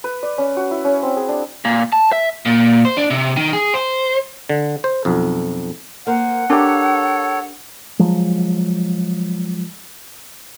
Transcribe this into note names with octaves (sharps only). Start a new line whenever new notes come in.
B4
D5
C#4
F#4
E4
C#4
C4
G#4
D4
A#2
A5
E5
A#2
C5
D4
C3
D#3
G#4
C5
D3
C5
B1 F2
A#3 A#4 C5 F#5
D4 G4 A4 A#4 C#5
F3 F#3 G#3